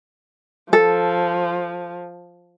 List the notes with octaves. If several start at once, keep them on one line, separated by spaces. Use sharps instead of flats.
F3 A4